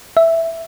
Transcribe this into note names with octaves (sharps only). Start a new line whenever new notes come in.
E5